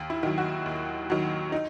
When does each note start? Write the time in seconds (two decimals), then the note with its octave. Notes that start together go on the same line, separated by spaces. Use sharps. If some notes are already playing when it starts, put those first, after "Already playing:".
Already playing: D#2
0.10 E4
0.23 D#3 F#3
0.38 F#4
0.66 D#2
1.10 D#3 F#3
1.52 D#4